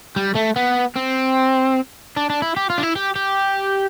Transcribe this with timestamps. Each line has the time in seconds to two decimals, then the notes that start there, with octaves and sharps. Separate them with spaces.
0.16 G3
0.35 A3
0.56 B3
0.96 C4
2.16 D4
2.30 D4
2.42 E4
2.57 G4
2.70 F4
2.78 D4
2.83 E4
2.95 G4
3.16 G4